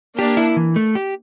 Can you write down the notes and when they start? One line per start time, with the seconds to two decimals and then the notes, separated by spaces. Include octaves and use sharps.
0.18 A#3 D4 G4
0.37 E4
0.57 E3
0.76 A3
0.95 G4